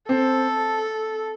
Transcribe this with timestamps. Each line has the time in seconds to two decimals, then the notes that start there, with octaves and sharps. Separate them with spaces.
0.09 C4 A4